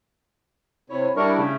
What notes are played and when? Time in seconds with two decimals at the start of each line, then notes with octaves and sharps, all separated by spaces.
0.90 C3 E4 C#5
1.16 G3 D4 E4 A#4 C#6
1.39 C#3 A3 C#4